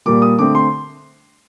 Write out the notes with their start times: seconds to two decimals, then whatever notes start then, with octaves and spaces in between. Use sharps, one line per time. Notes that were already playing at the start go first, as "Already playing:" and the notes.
0.06 A#2 G3 A#3 D6
0.22 D#6
0.39 D3 A3 C4 D6
0.55 C6